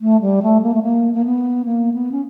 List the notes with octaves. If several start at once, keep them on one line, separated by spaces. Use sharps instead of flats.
A3
G3
A3
A#3
A3
A#3
A#3
B3
A#3
B3
C#4